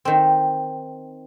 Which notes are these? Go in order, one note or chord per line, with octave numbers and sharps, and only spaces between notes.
D#3 C4